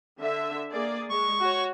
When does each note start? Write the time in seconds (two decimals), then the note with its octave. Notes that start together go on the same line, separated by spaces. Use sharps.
0.19 D3 E5
0.71 A#3 G#4 D5
1.10 G#3 C#6
1.40 F#4 C#5